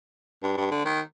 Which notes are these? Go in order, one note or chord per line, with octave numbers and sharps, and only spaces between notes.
G2
G2
D3
D#3